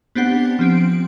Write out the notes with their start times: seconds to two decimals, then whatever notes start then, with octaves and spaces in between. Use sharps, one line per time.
0.15 B3 C4 D4 G4 F#5
0.59 F3 C4 D7